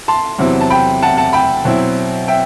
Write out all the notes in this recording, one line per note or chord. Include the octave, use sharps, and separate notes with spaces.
A5 C6
E2 C3 F#3 C4 E4
A5
G5 B5
F#5 A5
F#5 A5
G5 B5
B2 F#3 C4 E4
E5 G5